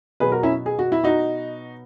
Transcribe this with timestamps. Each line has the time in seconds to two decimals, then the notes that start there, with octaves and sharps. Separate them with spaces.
0.20 B2 F#3 G#4 B4
0.32 F#4 A#4
0.43 C#4 E4
0.66 G#4
0.79 F#4
0.92 E4
1.04 D#4 F#4